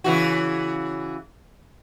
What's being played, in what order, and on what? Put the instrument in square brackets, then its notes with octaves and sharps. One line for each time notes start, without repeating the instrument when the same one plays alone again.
[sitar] C#3 E3 F#4